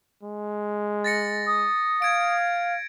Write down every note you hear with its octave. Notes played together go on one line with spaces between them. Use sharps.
G#3
A6 A#6 C#7
D#6
F5 G#6 D7